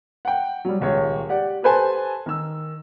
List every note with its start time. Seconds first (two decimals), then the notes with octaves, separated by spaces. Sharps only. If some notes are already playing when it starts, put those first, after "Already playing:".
0.25 F#5 G5
0.65 F#3 G3
0.80 D#1 C#2 C#5
1.29 G4 D5 F#5
1.62 G4 A4 B4 C5 G#5 A5
2.26 D#3 E6